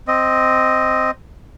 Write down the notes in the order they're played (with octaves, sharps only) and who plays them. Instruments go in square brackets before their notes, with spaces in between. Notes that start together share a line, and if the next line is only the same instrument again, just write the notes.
[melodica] C4 D#5